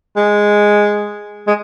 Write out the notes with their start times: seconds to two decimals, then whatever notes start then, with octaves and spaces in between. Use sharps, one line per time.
0.16 G#3
1.47 G#3